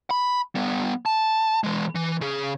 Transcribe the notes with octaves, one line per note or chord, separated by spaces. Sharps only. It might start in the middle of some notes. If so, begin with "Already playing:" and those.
B5
G3 B3
A5
E3 G#3
E3
C#3 G#4